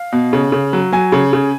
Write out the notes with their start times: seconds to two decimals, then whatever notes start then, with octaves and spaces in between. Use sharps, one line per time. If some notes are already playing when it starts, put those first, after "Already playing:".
Already playing: F5
0.12 B2
0.33 C#3
0.52 C#3
0.73 F#3
0.92 F#3 G#5
1.12 C#3
1.33 C#3